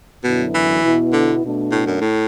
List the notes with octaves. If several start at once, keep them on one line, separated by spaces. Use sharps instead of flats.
F#2 B2 D3 F#3 B3 E4
E3
B2 B3 E4
D3
B2 A3 D4
A2
F#2
A2